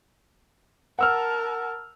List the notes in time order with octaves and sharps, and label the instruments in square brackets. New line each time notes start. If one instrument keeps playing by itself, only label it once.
[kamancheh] A#4 A5 [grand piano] F#5 E6 F6